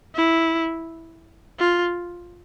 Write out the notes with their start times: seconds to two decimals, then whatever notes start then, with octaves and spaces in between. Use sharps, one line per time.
0.16 E4
1.60 F4